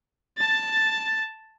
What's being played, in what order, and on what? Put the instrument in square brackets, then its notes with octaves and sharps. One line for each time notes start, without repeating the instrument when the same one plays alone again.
[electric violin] A5 A6